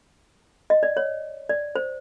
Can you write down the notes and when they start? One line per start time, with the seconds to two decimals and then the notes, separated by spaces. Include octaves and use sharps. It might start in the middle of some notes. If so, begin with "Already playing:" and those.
0.70 D#5
0.83 D5
0.97 C#5
1.49 D5
1.76 C5